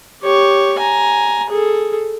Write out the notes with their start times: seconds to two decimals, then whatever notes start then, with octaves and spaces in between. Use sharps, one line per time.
0.23 G4 C#5
0.80 G#5 A#5
1.50 G#4 A4